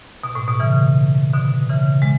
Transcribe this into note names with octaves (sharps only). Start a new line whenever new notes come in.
B2
A2
B2
C#3 E3
B2 D3
C#3 E3
G#3